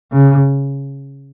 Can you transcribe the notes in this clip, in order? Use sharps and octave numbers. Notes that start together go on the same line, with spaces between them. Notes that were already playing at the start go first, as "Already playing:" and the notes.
C#3